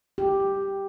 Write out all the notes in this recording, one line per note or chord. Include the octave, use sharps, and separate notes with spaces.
G4